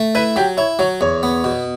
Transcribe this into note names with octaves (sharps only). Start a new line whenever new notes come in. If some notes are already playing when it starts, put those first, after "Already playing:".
Already playing: A3
E4 B4
F#3 G4
E4 C#5
F#3 C#5
E2 C#5
B3
B2